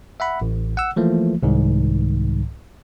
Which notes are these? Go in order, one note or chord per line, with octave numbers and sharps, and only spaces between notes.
E5 F#5 B5
A1
F#5 E6
E3 F3 A3 A#3
C2 G#2 D#3